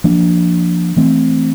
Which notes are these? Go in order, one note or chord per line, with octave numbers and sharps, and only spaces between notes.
F3 A#3 D4
E3 A3 C4